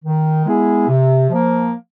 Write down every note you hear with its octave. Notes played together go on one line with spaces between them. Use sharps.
D#3
G#3 B3 E4 G#4
C3
F3 A#3